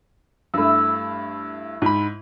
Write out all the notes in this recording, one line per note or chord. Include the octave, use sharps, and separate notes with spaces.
G2 A3 E4 E6
G#2 B5